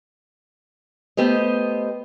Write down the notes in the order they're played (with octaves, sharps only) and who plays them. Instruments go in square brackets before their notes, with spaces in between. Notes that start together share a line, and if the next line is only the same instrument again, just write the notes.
[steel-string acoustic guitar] A3 B3 G4 C5 D#5